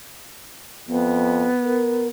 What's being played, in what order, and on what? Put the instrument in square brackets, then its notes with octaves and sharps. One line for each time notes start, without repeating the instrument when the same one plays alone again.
[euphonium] F2 [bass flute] B3
[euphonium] A#4